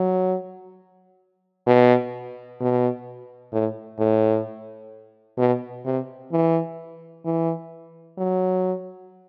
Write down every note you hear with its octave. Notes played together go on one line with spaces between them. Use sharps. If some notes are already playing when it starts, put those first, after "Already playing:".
Already playing: F#3
B2
B2
A2
A2
B2
C3
E3
E3
F#3